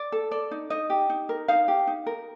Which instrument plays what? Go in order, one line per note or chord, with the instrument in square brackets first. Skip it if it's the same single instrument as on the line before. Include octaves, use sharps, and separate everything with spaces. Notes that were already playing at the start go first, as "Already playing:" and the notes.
Already playing: [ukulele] D5
A4
A4 D5
D#4
D#4 D#5
G4
D#4
A#4
D#4 F5
G4
D#4
A#4